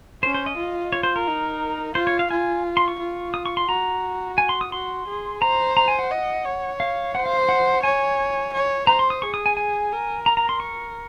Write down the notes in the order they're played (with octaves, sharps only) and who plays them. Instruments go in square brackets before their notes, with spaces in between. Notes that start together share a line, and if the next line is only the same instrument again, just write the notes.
[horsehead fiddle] C#4 [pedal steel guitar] C5
[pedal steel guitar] C5
D#5
[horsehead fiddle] F4
[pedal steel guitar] C#5
C5
A#4
[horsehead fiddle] D#4
[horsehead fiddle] F4 [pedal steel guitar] C5
[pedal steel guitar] C#5
F5
[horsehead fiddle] F4 [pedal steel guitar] G#5
[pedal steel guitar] C6
C#6
[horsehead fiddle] F4
[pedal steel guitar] D#6
C#6
C6
[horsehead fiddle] F#4 [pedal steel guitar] A#5
[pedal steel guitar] G#5
C6
D#6
[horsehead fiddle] F#4 [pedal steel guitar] C6
[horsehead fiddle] G#4
[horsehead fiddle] C5 [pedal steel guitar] A#5
[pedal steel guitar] A#5
G#5
F#5
[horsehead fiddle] D#5
C#5
[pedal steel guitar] F5
[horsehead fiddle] C5 [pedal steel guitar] F#5
[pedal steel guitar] F5
F#5
[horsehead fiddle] C#5 [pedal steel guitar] G#5
[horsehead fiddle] C#5
[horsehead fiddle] C5 [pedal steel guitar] A#5
[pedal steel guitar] C6
D#6
[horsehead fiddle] G#4 [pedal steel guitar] C#6
[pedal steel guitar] D#6
G#5
G#5
[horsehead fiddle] A#4
[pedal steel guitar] A#5
A#5
C6
C#6